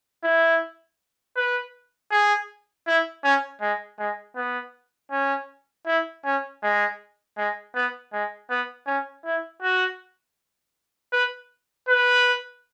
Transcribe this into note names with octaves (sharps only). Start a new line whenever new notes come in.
E4
B4
G#4
E4
C#4
G#3
G#3
B3
C#4
E4
C#4
G#3
G#3
B3
G#3
B3
C#4
E4
F#4
B4
B4